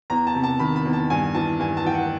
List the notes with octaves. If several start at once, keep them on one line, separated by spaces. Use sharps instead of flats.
E2 A#5
A5
C3
A5
D#3 B5
B5
E2
A5
G2 G#5
E3 A5
G2 G#5
A5
E3 G5
F#5